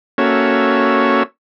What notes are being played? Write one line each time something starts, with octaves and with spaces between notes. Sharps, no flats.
A#3 C#4 F#4 A4 C#5 E5